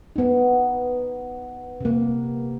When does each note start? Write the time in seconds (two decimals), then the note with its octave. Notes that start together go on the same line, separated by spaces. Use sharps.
0.16 B3 D#4
1.81 C3 A#3